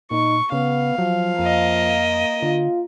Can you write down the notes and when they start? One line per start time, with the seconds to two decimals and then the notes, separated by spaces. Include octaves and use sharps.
0.11 A#2 D#4 C#6
0.52 C#3 B3 F5
0.98 F3 F#3
1.39 F2 A#3 D#5
2.42 D3 F4